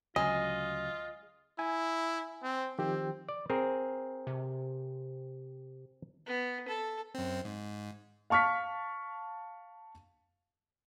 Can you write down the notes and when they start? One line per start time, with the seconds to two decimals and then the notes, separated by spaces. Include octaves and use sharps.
0.16 D2 C#3 F#3 G#3 F4 D#5
1.59 E4 G#5
2.43 C4
2.79 D#3 F3 C4 G4
3.29 D5
3.50 C4 G#4 A#4
4.27 C3
6.26 B3
6.68 A4
7.14 F#2 C4
7.45 G#2
8.30 F5 A5 C#6 F6 B6